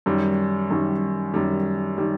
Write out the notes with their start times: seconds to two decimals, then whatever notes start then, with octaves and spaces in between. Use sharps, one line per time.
0.06 F#2 D#3 G3
0.70 F#2 D#3 G3
1.34 F#2 D#3 G3
1.98 D#3 G3